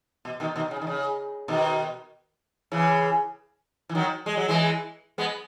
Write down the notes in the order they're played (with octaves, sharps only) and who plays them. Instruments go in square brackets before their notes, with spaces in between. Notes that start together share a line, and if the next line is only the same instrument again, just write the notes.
[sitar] B2
B2 D#3
B2 D#3
C#3
D#3
C#3
B2 D#3
C#3 E3
E3
D#3 F#3
G#3
F#3
E3 G#3
G#3 B3